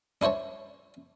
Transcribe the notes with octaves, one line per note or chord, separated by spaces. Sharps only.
D4 E4 C5 C#5 A5